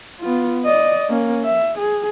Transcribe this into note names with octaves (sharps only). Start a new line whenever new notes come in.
B3 F4
D5 D#5
A#3 C#4
E5
G#4